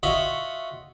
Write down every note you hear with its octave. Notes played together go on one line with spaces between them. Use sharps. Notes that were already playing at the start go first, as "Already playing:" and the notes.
F4 F#4 C#5 D#5 E5 F#5